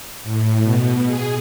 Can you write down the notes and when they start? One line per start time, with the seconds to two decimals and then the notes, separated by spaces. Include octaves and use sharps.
0.23 A2
0.63 B2
1.07 G#4